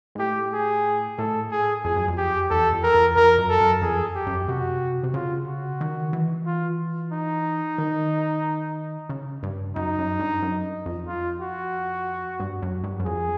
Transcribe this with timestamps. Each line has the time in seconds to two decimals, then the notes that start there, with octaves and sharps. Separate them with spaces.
0.15 G#2
0.19 A2 G4
0.53 G#4
1.18 A2 A4
1.51 G#4
1.84 F2 G#4
1.96 F#2
2.08 F2
2.17 G4
2.50 E2 A4
2.73 F2
2.83 A#4
2.95 F2
3.16 F2 A#4
3.38 F#2
3.49 A4
3.61 F#2
3.82 F2 G#4
4.15 G4
4.27 F#2
4.48 C3 F#4
5.03 C3
5.14 C#3 F4
5.47 F#4
5.81 D#3
6.13 E3
6.46 F4
7.12 D#4
7.78 D#3
9.09 C#3
9.43 G2
9.76 F#2 D#4
9.98 F#2
10.20 G2
10.42 F#2
10.86 F2
11.08 F4
11.40 F#4
12.40 G2
12.62 F#2
12.84 G2
13.00 F#2
13.05 F2 G#4